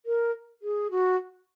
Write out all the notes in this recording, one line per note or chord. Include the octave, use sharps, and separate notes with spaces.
A#4
G#4
F#4